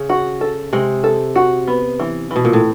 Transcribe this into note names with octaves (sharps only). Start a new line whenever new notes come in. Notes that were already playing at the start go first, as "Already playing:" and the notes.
Already playing: C#3
F#4
A4
C3 G#3
A4
F#4
B3
E3
E3
B2
A#2
A2